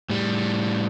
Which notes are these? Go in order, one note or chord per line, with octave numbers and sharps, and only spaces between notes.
A2 G3